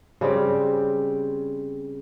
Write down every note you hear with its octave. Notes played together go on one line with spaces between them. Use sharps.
C#3 G3 C4 G4